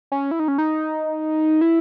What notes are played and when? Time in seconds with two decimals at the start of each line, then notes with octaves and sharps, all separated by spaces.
0.12 C#4
0.31 E4
0.39 D#4
0.48 C#4
0.58 D#4
1.61 E4